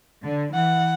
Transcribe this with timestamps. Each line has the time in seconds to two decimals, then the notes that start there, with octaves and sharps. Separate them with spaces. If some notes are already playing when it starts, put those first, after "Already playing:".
0.24 D3
0.54 E3 F#5